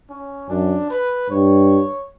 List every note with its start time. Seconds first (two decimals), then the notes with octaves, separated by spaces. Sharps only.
0.10 C#4
0.50 F#2 D4
0.90 B4
1.30 G2 C#5